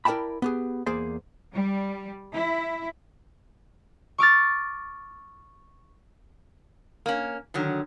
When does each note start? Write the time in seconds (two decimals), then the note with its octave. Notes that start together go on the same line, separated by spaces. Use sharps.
0.05 E4 A#4 D5 G5 A5 B5
0.42 B3 G4 G#4
0.86 E2 A#3 G#4 C5 D5
1.52 G3
2.31 E4
4.18 C#6 D6 F6 A6
7.06 A#3 C#4
7.54 D3 D#3 F#3